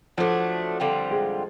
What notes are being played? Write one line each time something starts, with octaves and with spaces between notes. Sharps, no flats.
F3 F#3 A3 D4
D3 G3 C4 F4
G#3